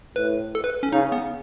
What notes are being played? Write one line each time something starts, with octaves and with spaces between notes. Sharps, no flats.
A2 B4
A4
B4
C#4
C#3 D#4
B3